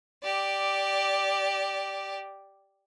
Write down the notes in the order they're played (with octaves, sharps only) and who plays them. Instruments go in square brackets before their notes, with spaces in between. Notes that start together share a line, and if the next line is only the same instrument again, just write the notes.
[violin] G4 D5